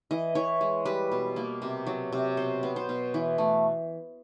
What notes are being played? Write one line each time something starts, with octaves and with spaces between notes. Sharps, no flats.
E3 D#5
E3 C#5
G#3
G3 B4
B2
A#3
C3
F#3
C3
B2 C5
B3
C5
B2
E3
A3